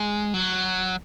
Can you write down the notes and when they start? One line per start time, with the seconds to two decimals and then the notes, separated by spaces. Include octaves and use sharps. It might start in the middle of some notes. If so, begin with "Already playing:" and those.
Already playing: G#3
0.34 F#3